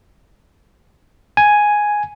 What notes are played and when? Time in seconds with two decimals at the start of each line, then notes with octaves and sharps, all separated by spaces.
1.37 G#5